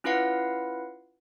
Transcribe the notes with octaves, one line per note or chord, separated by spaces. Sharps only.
C#4 E4 F4 B4 F5 F#5